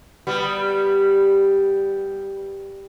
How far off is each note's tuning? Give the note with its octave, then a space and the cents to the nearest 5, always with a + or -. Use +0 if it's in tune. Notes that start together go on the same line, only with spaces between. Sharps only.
G3 +0 B3 +5